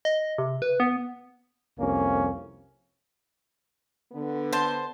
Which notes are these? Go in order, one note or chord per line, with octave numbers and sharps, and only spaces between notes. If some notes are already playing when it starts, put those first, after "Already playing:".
D#5
C3
B4
B3
C2 F2 A#3 C#4
D3 B3
C5 A5